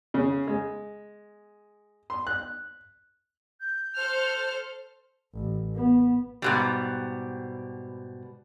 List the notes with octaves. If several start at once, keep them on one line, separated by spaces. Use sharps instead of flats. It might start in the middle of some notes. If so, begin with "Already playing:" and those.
C#3
G#3
C6
F#6
G6
A4 C5 F6
A1
B3
G#2 B2 G3